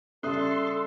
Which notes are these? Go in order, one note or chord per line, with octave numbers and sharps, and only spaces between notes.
C#3 G3 A4 E5 C6 D#6 F#6